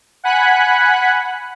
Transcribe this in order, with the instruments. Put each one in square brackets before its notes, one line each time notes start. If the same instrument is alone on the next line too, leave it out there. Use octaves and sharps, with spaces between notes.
[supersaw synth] F#5 G#5 B5 F#6